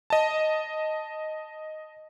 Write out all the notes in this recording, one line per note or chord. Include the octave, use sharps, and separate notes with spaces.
D#5 A5